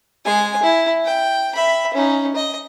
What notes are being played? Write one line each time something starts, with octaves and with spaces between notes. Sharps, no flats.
G#3 G#5
E4
G5
E5 B5
C#4 D#4
D#5